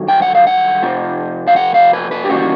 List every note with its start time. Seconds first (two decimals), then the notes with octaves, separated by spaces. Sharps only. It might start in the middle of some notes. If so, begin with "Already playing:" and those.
Already playing: G2 D#3 F#3
0.08 G5
0.22 F#5
0.35 F5
0.47 F#5
0.82 F2 C3 F3
1.48 F5
1.56 F#5
1.74 F5
1.93 B4
2.11 B4
2.24 G4
2.29 D#2 C#3 E3 G3 F#4